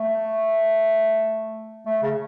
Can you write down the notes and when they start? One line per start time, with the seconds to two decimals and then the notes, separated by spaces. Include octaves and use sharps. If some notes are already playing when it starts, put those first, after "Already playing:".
Already playing: A3
1.86 A3
2.03 C#3